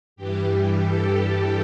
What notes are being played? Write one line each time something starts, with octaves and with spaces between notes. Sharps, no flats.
G2 E3 G3 G4
A4